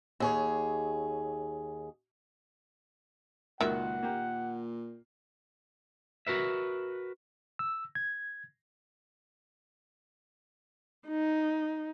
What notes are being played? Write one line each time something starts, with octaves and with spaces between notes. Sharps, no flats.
D#2 G#4 C#5
C#2 A#2 D#3 F#4 E5 F#5
A#3 G4
F#4 A#4 B4 E5
E6
G#6
D#4